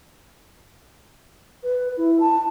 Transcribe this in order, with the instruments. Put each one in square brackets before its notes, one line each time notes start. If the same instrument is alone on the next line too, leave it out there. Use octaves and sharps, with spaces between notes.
[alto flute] B4
E4
A5